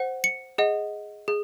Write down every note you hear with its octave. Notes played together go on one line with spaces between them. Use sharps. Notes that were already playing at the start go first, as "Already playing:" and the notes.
Already playing: C5 F#5
C#7
G#4 D#5 F#5
G#4